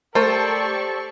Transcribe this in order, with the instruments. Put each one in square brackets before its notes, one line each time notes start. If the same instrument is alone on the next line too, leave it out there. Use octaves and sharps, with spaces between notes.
[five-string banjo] A3 A#4 [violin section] G4 D5 C#6 [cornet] A4 [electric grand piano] C5 A5